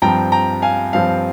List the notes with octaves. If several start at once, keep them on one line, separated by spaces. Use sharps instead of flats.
G2 F3 C4 G5 A#5
G5 A#5
F5 G#5
G2 F3 C4 F5